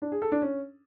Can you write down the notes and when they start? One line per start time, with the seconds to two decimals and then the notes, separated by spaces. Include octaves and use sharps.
0.02 D4
0.12 G#4
0.22 A4
0.32 D4
0.42 C#4